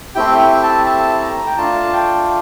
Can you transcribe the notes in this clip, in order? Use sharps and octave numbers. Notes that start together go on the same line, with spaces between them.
A3 C4 E4 G4 G5
G5
A5
A5
A#5
G5
A3 D4 F4 A5
G5